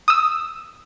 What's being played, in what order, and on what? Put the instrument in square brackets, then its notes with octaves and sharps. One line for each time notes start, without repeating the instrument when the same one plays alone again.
[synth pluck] D#6 E6